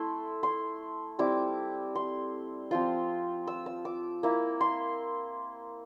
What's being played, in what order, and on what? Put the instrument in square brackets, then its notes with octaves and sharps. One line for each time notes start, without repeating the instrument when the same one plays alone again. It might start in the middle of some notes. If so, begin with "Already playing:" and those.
Already playing: [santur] A3 E4 C6
C6
G3 C4 E4 D6
C6
F3 C4 F4 C6
E6
E6
D6
A#3 E4
C6